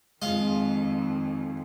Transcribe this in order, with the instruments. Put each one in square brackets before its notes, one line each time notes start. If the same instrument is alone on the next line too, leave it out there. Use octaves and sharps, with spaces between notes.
[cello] F2 D#3 [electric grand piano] G#3 F4 [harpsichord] D#5 F5